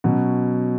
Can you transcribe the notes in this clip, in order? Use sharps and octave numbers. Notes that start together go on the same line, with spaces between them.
B2 F#3 C#4